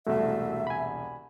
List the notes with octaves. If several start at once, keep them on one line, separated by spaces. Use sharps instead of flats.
E1 C2 A3 F#4 E5
G#5 B5